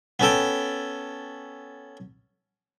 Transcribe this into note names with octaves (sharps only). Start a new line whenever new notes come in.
B3 C#4 A4 G5